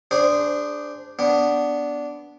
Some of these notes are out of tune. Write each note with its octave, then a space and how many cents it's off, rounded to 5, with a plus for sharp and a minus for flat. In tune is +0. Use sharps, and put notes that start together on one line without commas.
D4 +0 G#4 -15 C5 -15
B3 +0 D4 -10